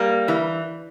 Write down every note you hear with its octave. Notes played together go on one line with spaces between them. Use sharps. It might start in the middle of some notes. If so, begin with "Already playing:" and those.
Already playing: G3 A#3
E3